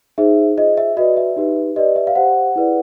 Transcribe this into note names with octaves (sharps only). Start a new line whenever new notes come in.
D#4 G#4 C5 E5
F4 G#4 C5 D#5
E5
F#4 B4 D5 D#5
E5
D#4 G4 B4
G4 B4 D5 D#5
E5
F5
G4 C5 F#5
E4 G#4 B4 D5